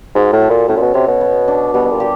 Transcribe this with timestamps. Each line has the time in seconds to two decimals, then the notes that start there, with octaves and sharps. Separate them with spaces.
0.15 G#2 F#4
0.33 A2
0.42 A4
0.50 A#2
0.68 A2 C#4
0.77 A#2
0.82 B2
0.94 C3 C#5
1.08 B2
1.21 B3
1.48 D4
1.74 B2 G3
1.85 B2
1.91 A#2
2.00 G4